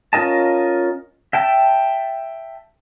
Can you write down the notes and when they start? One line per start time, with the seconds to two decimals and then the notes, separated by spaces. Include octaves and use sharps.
0.13 C#4 F4 A#4 D#5 A5
1.33 E5 G5 A5